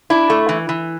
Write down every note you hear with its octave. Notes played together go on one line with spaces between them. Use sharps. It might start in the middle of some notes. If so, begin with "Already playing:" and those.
D4 E4
A3
E3
E3